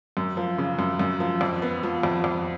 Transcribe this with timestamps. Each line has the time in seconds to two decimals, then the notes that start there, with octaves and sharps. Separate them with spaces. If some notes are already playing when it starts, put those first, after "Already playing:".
0.17 F#2
0.37 F3
0.58 C#3
0.79 F#2
0.99 F#2
1.20 F3
1.41 F2
1.62 B3
1.83 F3
2.03 F2
2.24 F2